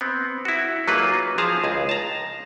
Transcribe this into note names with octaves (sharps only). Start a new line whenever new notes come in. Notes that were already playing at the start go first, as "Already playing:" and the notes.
B3 C4
E4 F#4
F#3 A#3 D#4 F4 G#4 B4
F3 G#4 A5 A#5
C#2 G#4
A5 A#5